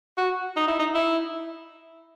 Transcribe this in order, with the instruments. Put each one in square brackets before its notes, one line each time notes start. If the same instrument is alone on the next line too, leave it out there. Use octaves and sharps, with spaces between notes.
[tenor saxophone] F#4
D#4
E4
D#4
E4